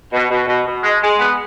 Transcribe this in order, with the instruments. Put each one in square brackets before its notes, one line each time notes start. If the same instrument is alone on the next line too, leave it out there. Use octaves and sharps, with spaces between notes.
[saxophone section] B2
B2
B2
B2
G#3
G#3
B3